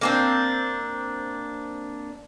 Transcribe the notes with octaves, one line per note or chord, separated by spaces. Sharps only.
A#3 C4 D4